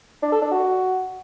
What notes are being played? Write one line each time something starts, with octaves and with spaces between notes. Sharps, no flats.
D4
A4
D4
F#4